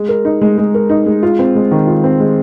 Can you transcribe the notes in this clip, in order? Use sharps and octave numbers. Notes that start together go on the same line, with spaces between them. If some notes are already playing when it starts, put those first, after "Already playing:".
Already playing: G#3
A#4
D#4
G#3
G#3
A#4
D#4
G#3
F4
C4
G#3
D#3
F4
C4
G#3